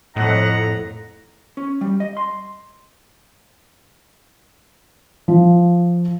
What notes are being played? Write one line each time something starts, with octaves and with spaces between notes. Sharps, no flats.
F2 A2 D#5 F#5 A#5
C#4
G3
D#5
C6
F3